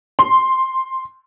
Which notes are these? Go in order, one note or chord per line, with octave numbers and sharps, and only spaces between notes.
C6